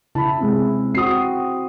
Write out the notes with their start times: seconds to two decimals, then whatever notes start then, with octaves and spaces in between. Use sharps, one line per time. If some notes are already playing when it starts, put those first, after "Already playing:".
0.15 C#3 E4 A5 B5
0.40 C3 G#3
0.95 C4 F#4 D#6 C7